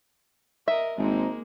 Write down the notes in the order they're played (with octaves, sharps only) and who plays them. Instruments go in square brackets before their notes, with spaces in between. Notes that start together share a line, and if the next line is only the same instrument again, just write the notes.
[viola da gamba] A#4 D#5 [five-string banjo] E5
[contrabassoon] G#1 [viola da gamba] G#3 A#3 [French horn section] C4 D#4